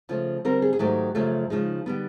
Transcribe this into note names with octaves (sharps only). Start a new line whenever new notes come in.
C#3 F3 A3
D3 G3 C4 A#4
G#4
G#4
G#2 D#3 F#3 A3 G4
F#2 C#3 F3 A3 C#4
C#3 F3 G#3 D#4
D3 G3 B3